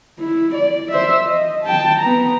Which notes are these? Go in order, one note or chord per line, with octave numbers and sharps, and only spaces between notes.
E4
D5
C5 E5
D#5
G5 A5
B3 A#5